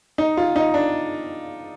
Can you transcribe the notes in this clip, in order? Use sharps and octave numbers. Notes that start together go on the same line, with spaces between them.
D#4
F4
D#4
D4